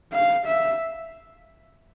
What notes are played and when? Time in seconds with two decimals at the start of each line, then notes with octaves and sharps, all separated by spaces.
0.13 F5
0.47 E5